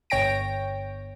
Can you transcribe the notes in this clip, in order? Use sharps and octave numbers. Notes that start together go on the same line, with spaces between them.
G1 C#5 G5 A#6 D7